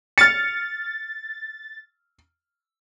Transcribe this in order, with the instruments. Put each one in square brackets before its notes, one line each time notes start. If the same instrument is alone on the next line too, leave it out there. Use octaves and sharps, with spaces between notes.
[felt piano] F6 C#7 [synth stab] A6